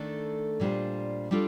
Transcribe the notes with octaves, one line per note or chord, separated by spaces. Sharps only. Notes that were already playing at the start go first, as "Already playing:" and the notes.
Already playing: D#3 A3 D4 A4
A#2 G3 D4 F4 C5
G3 D4 F4 A4 D5